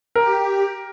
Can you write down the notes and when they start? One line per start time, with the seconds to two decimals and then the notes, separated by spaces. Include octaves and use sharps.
0.15 G4 A#4